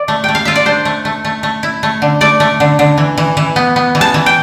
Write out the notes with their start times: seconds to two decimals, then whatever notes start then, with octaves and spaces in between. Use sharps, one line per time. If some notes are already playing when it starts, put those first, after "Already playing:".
Already playing: D5
0.08 A3
0.24 A3 G5
0.35 F5
0.45 F4 E5
0.56 D5
0.66 D4 C5
0.85 A3
1.05 A3
1.25 A3
1.43 A3
1.63 E4
1.83 A3
2.02 D3
2.21 A3 D5
2.40 A3
2.60 D3
2.79 D3
2.98 E3
3.18 E3
3.37 E3
3.56 B3
3.76 B3
3.95 E3
4.01 A5
4.14 E3
4.26 G5